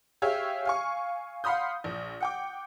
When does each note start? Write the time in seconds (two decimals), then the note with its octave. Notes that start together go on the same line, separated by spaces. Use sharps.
0.22 G4 G#4 C#5 E5 F5
0.65 F5 G#5 C#6
1.44 F5 F#5 B5 C6 D#6 G6
1.84 A#1
2.21 F#5 G5 D6